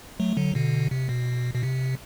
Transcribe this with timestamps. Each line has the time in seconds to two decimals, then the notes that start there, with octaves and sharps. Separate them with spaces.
0.20 F#3 A3
0.37 D3 F#3
0.55 B2 D3
0.91 C3
1.09 B2
1.55 B2
1.63 C3